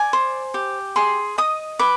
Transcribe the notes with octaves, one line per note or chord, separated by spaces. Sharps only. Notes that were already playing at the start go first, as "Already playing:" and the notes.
Already playing: D5 G#5
C5
G4
G#4 C6
D#5 D#6
B4 D6